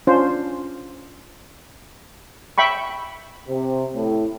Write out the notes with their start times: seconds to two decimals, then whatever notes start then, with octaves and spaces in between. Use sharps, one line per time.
0.07 C#4 D4 F4 C5
2.58 E5 G5 B5 C#6
3.48 C3
3.94 A2